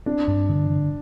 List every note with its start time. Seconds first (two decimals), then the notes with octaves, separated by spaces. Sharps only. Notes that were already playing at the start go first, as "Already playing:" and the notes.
0.06 C4 D4
0.28 G2
0.49 D3
0.70 D3